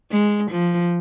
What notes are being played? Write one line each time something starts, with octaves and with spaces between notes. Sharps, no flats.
G#3
F3